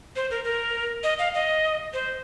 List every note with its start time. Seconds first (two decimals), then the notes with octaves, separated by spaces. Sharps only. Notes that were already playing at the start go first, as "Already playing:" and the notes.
0.16 C5
0.31 A#4
0.44 A#4
1.03 D#5
1.19 F5
1.34 D#5
1.93 C5